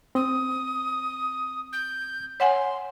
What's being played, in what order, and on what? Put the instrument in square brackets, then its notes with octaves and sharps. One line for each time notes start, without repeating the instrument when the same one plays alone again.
[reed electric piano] C4 [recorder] D#6
[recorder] G6
[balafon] C#5 F#5 G#5 [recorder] C6